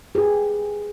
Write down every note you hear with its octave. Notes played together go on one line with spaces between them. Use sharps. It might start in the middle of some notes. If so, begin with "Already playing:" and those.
G4 G#4 B4